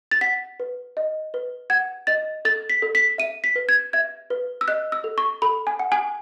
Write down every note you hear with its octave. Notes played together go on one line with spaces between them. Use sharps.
A6
F#5 B6
B4
D#5
B4
F#5 G#6
D#5 A6
A4 A6
B6
A4
B6
E5 D#7
B6
B4
G#6
E5 G#6
B4
E6
D#5 F#6
E6
A4
C#6
A4 B5
G#5
F#5
G#5